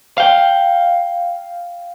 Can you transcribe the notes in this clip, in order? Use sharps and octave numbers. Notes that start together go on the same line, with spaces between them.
F5 G5